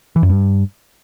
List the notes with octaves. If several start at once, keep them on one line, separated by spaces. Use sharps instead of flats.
E3
F#2
G2